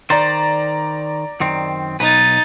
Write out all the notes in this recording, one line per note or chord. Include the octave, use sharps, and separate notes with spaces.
D#3 C5 D5 A#5 A6
F#2 D#3 C4
B1 D#4 B4 A6